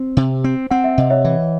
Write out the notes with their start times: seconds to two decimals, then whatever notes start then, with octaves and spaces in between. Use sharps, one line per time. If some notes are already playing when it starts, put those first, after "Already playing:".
Already playing: C4
0.17 C3
0.44 C4
0.71 C4 F#5
0.84 E5
0.98 C3 D#5
1.10 C#5 E5
1.25 E3